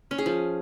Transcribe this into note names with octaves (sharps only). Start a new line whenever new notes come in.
C#4
G#4
F3